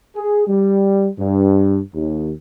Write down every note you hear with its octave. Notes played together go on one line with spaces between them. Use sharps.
G#4
G3
G2
D#2